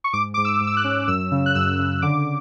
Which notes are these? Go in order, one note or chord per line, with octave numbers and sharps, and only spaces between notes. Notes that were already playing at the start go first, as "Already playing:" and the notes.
C#6
G#2 D6
G#2 D6
E6
G#2
E6
F#6
C#4
F#2 E6
C#3
F#6
F#2 E6
C#3
D3 D6